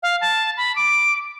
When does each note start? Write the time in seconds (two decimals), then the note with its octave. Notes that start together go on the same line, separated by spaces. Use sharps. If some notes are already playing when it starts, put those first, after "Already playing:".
0.03 F5
0.21 A5
0.57 B5
0.76 D6